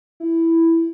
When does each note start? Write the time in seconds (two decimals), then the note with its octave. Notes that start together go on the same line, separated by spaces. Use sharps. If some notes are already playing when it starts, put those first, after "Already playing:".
0.20 E4